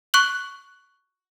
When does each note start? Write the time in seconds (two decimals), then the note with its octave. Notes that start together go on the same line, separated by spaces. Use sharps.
0.14 C#6 F#6 F#7